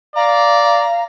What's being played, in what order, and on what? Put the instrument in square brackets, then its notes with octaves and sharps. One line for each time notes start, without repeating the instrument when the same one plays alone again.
[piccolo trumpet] D5 [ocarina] F5 [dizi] A#5